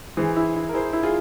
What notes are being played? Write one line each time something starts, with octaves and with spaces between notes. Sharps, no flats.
E3 G#4 C5
E4
E4
A#4
E4 G#4 C5
E4
F4 G#4